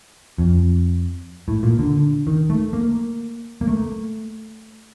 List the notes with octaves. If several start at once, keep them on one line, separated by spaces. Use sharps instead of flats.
F2
A2
A#2
D3
D#3
A3
A#3
A#3
A3